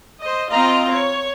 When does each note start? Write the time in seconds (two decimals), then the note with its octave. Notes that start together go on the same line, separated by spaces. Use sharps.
0.21 C5 D#5
0.51 C4 F4 D#5 A#5
0.91 C#5